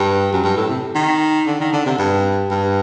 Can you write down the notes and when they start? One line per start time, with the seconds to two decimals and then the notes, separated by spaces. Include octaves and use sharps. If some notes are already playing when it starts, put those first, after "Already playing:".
Already playing: G2
0.33 F#2
0.44 G2
0.57 A2
0.69 C3
0.95 D#3
1.47 D3
1.60 D#3
1.73 D3
1.86 C3
1.99 G2
2.51 G2